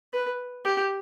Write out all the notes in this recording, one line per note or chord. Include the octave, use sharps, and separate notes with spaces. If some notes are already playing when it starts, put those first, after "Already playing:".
B4
G4